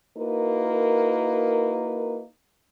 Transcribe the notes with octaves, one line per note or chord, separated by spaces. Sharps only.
A#3 D#4 E4 F#4 A#4 B4